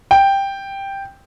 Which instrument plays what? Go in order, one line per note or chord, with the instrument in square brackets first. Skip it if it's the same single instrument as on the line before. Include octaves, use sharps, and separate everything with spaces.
[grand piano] G5